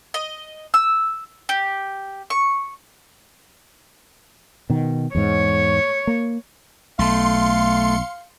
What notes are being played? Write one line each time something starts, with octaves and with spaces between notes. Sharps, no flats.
D#5
E6
G4
C#6
B2 D#3
E2 G#2 C#5
A#3
B1 A3 F5 C6 C#7